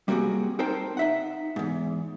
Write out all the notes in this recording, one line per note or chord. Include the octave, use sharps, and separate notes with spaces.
G3 A#3 C4 F4 F#4 G#4
C4 D#4 A#4 C5 G5 A5
D#4 E5 F#5
E2 G#2